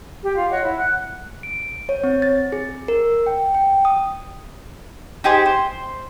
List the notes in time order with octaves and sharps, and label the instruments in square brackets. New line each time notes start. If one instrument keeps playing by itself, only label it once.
[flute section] G4
F4
C#5 D#5 F#5
E4
F#5 F#6
[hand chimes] D7
C#5
C4
A6
G#4
A#4
G5
G5
D#6
[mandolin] D#4 G4 G#4 C5
C5